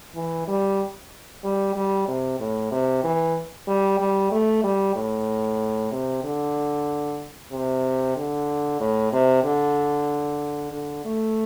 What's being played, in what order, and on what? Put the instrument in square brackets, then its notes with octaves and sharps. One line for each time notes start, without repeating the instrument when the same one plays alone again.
[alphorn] E3
G3
G3
G3
C3
A2
C3
E3
G3
G3
A3
G3
A2
C3
D3
C3
D3
A2
C3
D3
D3
A3